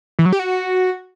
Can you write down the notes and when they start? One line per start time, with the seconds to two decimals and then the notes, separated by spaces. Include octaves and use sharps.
0.19 E3
0.26 F#3
0.32 G4
0.39 F#4